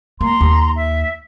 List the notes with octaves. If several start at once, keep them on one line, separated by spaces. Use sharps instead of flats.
A#3 A#5 C6
D#2
E5